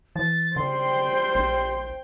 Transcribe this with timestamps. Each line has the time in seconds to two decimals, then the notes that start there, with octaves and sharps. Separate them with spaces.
0.16 E3 A6
0.56 C#3 G3 C5 G5 C6
1.35 A#1